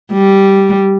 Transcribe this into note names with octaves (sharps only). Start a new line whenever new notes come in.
G3